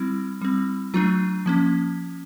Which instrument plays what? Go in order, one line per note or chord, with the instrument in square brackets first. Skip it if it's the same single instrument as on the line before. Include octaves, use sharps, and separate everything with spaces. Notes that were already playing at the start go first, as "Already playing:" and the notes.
Already playing: [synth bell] G3 C4 E4
G3 C4
F#3 A3 D4 F4
F3 A#3 C#4